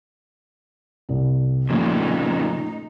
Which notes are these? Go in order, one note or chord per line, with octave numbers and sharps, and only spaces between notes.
C2
F2 A#2 C#3 F3 A3 D#4